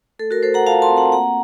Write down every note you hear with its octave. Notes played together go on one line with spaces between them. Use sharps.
A3 A4
F#4 A#4
A3 A4 C5
F#5 A#5
F4 F5 A5
A5 C6
C4
F#5 A#5
A#3 F#5 A#5